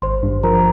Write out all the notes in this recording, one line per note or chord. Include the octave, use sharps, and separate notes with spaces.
G#1 C5 C6
G2
F3 A#4 A#5